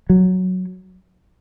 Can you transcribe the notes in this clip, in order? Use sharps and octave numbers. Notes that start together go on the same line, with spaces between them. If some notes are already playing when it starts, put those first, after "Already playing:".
F#3